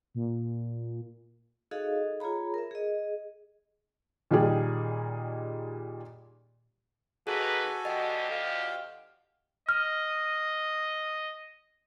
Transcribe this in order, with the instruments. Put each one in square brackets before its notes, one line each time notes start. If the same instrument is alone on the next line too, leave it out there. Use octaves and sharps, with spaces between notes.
[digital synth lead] A#2
[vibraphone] D#4 F#4 G#4 A4 D#5 F5
F4 G#4 C#5 A#5 B5
A#4 E5
G#4 D#5
[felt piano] A#2 D#3 G3 G4 G#4
[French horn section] D#2 D#4 B4 [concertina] F#4 A4 G#5 [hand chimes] G#4
[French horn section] D2 F3 G4 [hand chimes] D#5 F#5
[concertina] F5
[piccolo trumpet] D#5 [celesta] F6